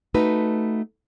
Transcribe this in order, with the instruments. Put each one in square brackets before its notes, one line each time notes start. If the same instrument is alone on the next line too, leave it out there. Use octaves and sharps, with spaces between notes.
[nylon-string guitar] A3 D#4 F#4 B4